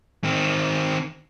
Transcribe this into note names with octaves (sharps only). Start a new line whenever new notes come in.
D#3 C4